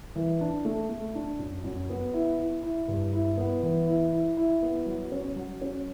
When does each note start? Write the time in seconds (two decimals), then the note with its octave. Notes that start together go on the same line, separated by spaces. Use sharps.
0.16 E3
0.41 D4
0.65 A3
0.89 A3
1.15 D4
1.39 F#2
1.64 F#2
1.90 B3
2.14 E4
2.39 E4
2.63 E4
2.88 G2
3.13 E4
3.37 B3
3.63 E3
3.87 E4
4.13 E4
4.37 E4
4.62 B3
4.86 F#3
5.12 C#4
5.36 F#3
5.61 C#4